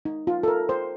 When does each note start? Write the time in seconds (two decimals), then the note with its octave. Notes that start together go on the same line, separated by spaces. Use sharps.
0.05 D#4
0.27 F4
0.43 A4
0.48 A#4
0.69 C5